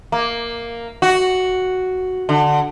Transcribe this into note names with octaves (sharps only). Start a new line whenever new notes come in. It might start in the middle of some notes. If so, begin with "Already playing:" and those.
A#3
F#4
D3